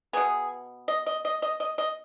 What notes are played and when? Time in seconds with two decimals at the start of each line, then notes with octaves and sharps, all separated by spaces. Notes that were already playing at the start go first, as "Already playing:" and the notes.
0.13 B2 B3 G#4
0.88 D#5
1.06 D#5
1.25 D#5
1.42 D#5
1.60 D#5
1.78 D#5